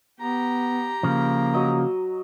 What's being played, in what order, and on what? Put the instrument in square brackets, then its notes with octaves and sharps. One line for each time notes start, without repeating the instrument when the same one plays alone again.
[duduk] B3 [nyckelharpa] G4 A#5
[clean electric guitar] C#3 F3 [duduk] A#3
[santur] F#3 D#5 D#6